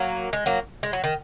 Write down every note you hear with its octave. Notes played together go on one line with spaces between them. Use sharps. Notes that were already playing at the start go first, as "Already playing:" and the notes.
Already playing: F#3 A#3
G#3
F#3 A#3
G#3
F#3
D#3